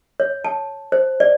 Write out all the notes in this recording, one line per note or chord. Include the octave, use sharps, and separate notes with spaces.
C#5
A5
C5
D5